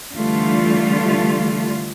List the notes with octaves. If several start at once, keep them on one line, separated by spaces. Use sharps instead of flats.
D3 E3 G3 A3 F4